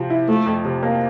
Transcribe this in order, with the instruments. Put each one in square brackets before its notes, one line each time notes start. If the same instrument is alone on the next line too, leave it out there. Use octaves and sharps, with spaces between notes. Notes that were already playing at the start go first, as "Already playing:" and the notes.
Already playing: [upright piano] C3 F3 C4
E4
[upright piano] F3 [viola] A3
[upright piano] F2
C3
A#3